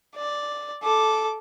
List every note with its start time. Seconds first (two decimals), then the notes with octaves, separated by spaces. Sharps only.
0.16 D5
0.83 A4 D6